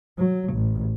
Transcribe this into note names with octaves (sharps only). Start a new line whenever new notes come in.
F#3
A1